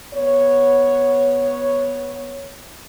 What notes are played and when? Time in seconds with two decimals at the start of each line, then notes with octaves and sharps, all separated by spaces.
0.13 B3 C#5